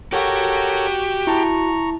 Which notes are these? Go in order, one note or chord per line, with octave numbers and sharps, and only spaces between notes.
F#4 G4 A4 A#4 C#5 F#5
E4 A5 A#5 C#6